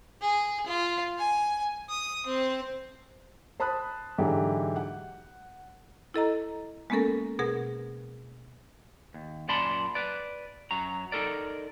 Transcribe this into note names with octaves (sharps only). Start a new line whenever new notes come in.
G#4
F4
G#5
D#6
C4
C5 A5 B5 D#6 F#6
G#2 D3 E3 F#3 E4 G4
F#5
E4 A4 D#5 A#5
G#3 A#3 B3 C#4 A4 A#4
B2 G#4 A#4 F#5
D#2
F#2 A#2 D5 A5 B5 C6
B4 D5
F#2 F#3 A#5
D#4 F#4 A4 A#4 D5